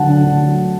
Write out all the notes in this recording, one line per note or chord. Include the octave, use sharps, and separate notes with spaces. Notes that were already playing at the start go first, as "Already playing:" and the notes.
Already playing: D2 F#3 F#5 A5
D3
D2
F#3